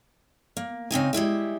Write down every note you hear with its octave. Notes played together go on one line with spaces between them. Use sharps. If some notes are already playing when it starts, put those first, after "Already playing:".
A#3
C#3 C4 D#4 G#5
G3 G#3 E4 E5